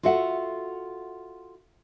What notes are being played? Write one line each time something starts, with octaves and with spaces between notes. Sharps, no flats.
F4 F#4 A4 E5 F#5